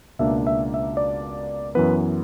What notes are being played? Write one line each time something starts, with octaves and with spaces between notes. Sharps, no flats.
C#2 B2 A#3 D4 E5
E5
E5
D5
F#2 E3 B3 B4